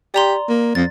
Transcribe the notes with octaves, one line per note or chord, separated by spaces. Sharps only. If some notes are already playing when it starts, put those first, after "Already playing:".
G4 D5 A#5 C6
A#3
F2 A6